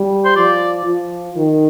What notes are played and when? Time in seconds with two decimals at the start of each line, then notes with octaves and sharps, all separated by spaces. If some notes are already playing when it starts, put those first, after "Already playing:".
Already playing: G3
0.25 C5
0.36 F3 D5
0.85 F3
1.36 D#3